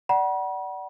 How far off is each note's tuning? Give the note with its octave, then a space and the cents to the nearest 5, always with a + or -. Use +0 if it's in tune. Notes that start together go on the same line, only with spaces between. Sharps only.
D5 +0 F#5 +30 B5 -45